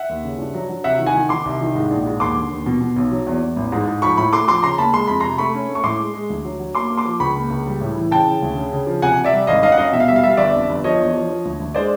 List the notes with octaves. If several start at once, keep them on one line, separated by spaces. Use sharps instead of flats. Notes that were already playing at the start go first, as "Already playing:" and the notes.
Already playing: E5 F#5
D#2
C#3
G2
F#3
F#3
C3 E5 F#5
D#3
F#5 G#5
D#3
D#3 C6 D6
C2
D#3
G#2
A#1
G#2
D#2 C6 D6
D3
D#2
B2
B2
B1
F#3
E2
E2
A1
G#2
G#2
F3 B5 C#6
A2 B5 C#6
A3 C6 D6
F3 C6 D6
C#3 A#5 C6
A#3 A5 B5
G#3 C6
F2 B5
C3 A#5 C6
A3 B5 C#6
C#4
A3
C#6
A2 C6 D6
G#3
G#3
D2
F#3
F#3
A#3 C6 D6
A#3
C6 D6
F3
C#2 B5 C#6
A#3
C#2
G3
A2
E3
C#3 G5 A5
C#3
D2
C#3
C#3
F3
C3 F#5 G#5
C3
D5 E5
G3
G#1 D#5 F5
F#2 D#5 F5
F#5
F#2 D#5 F5
B2 E5
F5
G3 E5
F5
G3 E5
F5
G1 D5 E5
F2
G1
F3 C#5 D#5
E2
F3
F3
D2
D2
G#3 C5 D5